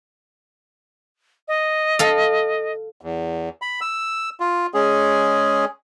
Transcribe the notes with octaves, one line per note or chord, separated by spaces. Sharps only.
D#5
A4 F5
E2
B5
E6
F4
G#3 C#4 G#4